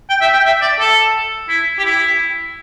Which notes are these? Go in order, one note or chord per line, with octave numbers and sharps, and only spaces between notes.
G5
E5
G5
E5
D5
A4
E4
G4
E4